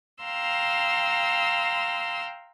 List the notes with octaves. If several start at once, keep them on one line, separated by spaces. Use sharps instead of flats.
F5 G5 A#5 C6 E6